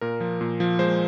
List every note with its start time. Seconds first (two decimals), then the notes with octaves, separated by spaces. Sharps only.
0.01 A#2 A#4
0.20 F3
0.41 A#2
0.60 F3
0.79 G#3 C5